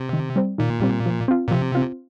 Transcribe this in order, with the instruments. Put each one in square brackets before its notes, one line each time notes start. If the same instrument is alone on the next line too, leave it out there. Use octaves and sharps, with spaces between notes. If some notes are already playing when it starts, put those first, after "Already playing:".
Already playing: [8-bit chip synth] C3
[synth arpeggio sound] D#3
G3 C4
[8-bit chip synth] A#2 [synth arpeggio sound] D#3
[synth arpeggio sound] G3 C4
F3
C4 F4
[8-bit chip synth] A#2
[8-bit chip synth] C3 [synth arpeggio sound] F3
[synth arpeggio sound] C4 F4